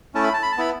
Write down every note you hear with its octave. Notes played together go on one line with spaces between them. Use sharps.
A3 C#4 E4 A5
B5
A5
B5
A5
B3 E4 B5